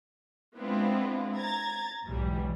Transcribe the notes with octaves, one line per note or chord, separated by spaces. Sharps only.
G#3 B3 C4 D4 E4 F4
A#5 G#6 A6
B1 E2 G#2 B2 E3 G3